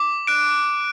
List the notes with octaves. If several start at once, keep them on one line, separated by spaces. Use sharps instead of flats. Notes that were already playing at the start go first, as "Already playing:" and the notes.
Already playing: D6
F#6 D7